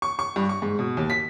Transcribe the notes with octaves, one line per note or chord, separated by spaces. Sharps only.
C#6
C#6
G2
C#6
G#2
B2
D#2
B6